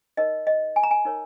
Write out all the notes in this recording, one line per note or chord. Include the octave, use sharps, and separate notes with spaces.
D#4 A#4 C#5 D#5
D#5
G#5
A#5
G#5
D#4 A#4 C#5